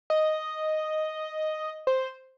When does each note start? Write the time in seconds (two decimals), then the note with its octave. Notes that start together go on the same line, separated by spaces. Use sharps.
0.10 D#5
1.87 C5